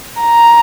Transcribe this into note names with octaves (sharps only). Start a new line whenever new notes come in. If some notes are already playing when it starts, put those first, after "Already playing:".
A#5